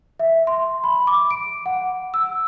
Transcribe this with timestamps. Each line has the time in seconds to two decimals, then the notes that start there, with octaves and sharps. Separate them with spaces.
0.20 E5
0.47 C6
0.84 B5
1.07 D6
1.31 D7
1.66 F#5
2.14 E6